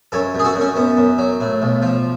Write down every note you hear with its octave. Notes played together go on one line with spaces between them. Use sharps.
F#2 A4 C#5
F#2 G#4
F#4 A4
F#2
C#4
F#2 B3
F#2
F#3
A2
B1
F3